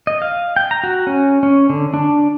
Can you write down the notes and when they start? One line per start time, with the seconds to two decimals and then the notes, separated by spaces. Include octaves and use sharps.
0.07 D#5
0.22 F5
0.56 G5
0.71 A#5
0.84 F#4
1.07 C#4
1.43 C#4
1.70 D3
1.94 D4